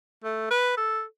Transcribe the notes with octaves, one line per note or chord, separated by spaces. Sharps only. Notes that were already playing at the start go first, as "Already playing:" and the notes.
A3
B4
A4